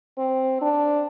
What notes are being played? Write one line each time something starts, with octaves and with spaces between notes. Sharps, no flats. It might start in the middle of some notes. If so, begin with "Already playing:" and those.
C4
D4